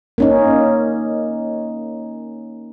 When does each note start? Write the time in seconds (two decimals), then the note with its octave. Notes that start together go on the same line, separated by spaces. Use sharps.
0.18 A#3 C#4 D#4